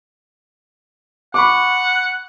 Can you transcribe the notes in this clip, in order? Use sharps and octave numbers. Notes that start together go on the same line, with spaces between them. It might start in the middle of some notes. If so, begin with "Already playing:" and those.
F#5 B5 C#6 D6